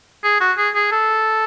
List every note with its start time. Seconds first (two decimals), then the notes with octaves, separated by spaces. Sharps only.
0.23 G#4
0.40 F#4
0.57 G#4
0.75 G#4
0.91 A4